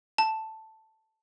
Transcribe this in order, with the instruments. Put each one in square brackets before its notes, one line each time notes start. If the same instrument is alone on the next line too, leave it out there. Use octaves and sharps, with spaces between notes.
[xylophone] A5